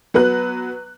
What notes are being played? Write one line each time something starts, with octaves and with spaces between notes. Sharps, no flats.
F#3 B3 B4 F#6